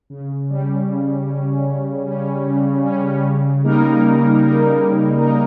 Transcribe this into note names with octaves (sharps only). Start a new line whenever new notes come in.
C#3
G3 C#4
C#3
G3 C#4
C#3
G3 C#4
C#3
G3 C#4
C#3
G3 A#3 D#4 A#4
C#3
G3 A#3 D#4 A#4
C#3
G3 A#3 D#4 A#4